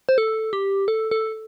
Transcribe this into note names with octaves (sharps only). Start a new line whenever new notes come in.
C5
A4
G4
A4
A4